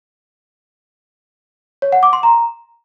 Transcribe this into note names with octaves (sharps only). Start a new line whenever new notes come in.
C#5
F#5
D6
C6
A#5